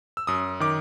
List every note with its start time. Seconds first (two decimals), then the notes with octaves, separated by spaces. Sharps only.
0.17 E6
0.27 F#2 D#6
0.60 D#3 D6